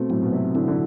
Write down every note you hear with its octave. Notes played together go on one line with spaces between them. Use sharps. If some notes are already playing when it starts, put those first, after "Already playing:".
Already playing: B2 A3 C4
A2 F#3
B2
C3
D3 E4
D3